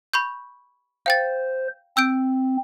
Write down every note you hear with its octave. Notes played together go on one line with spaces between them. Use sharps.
B5 C#6 G6
C5 F5 G5 A6
C4 E6 G6 D7